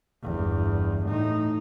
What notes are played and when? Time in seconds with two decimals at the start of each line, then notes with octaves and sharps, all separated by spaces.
0.23 G1 E2
1.07 A2 D#4